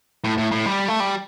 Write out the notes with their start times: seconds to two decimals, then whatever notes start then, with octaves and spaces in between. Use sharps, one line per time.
0.24 A2
0.38 A2
0.52 A2
0.66 G3
0.88 A3
1.00 G3